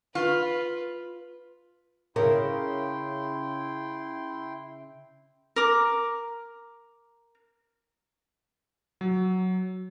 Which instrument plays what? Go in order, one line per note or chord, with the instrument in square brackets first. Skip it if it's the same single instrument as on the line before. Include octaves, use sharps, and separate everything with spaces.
[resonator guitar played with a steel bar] F4 [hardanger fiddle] B4
[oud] C#3 [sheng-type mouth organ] E4 G5 C6 [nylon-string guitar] A#4
[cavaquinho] A#4 D6
[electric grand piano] F#3